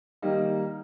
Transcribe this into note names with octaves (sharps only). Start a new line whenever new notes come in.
D#3 G3 A#3 D#4